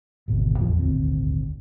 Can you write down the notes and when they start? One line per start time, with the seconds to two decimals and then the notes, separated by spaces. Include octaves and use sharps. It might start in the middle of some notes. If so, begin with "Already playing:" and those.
0.28 G#1 D2 B2
0.57 A1 E2 E3 F3
0.78 D#1 G#1 D2 C4